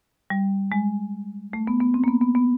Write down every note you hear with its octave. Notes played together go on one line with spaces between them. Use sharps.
G3
G#3
A3
B3
B3
C4
A#3
B3
B3
B3